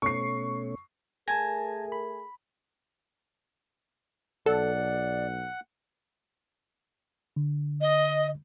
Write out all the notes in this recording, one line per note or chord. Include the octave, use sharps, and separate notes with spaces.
B2 A3 C#4 C#6 C7
A3 G#4 A#4 G#5 A5 G#6 A#6
B5
B1 A4 D5 F#5
D3
D#5